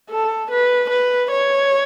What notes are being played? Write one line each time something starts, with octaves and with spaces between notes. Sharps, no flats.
A4
B4
B4
C#5